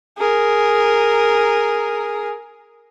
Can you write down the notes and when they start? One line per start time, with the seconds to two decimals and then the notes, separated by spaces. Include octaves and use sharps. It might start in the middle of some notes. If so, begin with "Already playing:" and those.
0.17 G#4 A#4